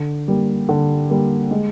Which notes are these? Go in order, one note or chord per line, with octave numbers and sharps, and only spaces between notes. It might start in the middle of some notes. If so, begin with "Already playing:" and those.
Already playing: D3
G3 A#3
D3
G3 A#3
G#3